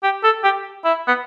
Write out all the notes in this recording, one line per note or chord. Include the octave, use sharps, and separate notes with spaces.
G4
A4
G4
E4
B3